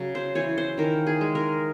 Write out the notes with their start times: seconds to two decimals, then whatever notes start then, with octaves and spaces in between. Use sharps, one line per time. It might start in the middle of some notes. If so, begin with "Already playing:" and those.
Already playing: C#3 F#3
0.15 C5
0.35 E3 C#5
0.58 C5
0.78 D#3 A#4
1.07 G#4
1.21 G#3
1.35 A#4